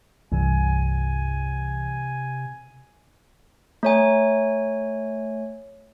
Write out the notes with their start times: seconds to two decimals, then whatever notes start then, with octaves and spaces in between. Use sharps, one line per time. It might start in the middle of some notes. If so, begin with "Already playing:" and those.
0.32 C2 G2 C3 E3 G#5
3.83 A3 C#5 G#5